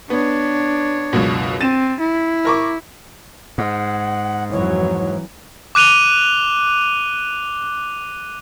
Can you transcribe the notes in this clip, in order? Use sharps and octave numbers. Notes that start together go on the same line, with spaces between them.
B3 D4 C#5
C#2 F#2 B2
C4 A6 D#7 E7
E4
A#4 C#6 D6
G#2 F#5
F2 E3 F#3 C#5
D6 F#6 D#7 F7 G7